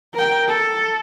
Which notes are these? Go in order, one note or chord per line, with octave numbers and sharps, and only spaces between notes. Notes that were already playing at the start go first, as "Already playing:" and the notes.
A#4 G5
A4